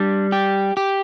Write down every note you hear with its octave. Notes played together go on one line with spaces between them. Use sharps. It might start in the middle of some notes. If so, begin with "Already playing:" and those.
Already playing: G3 D4
G4
G4